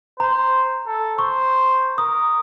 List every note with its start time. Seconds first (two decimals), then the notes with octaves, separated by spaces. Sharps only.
0.20 C5 A#5
0.86 A4
1.19 C5 C#6
1.98 A#4 D#6